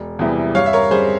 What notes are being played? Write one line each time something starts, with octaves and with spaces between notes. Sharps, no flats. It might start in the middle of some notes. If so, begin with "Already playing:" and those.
Already playing: E1
E2 C3 E3 G3
G2 C#5 F5
E5
A#4 C#5
G3 C#4 G#4 C5